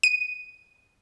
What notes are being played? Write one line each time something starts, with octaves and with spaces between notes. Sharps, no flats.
D#7